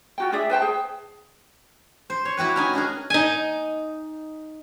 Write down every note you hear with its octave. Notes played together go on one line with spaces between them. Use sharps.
F4 F#4 G5
D4 G#4 D5 E5
B4 C5 G5 A5
G#4
C5
C#5
E4 F#4 G4 B4
C#4 D#4 G#5
D4 F#4 G#4 A#4
D#4 G#5